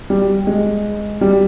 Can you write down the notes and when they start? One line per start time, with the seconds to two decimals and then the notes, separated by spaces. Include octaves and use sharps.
0.10 G3
0.47 G#3
1.21 G3